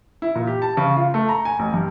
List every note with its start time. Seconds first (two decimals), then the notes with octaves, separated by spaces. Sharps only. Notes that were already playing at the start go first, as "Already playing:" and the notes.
0.22 E4
0.35 A#2
0.47 G4
0.62 A5
0.77 C#3
0.96 F4
1.14 A3
1.29 A#5
1.45 G#5
1.59 A1
1.74 G2